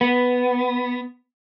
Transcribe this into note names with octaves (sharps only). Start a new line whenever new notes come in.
B3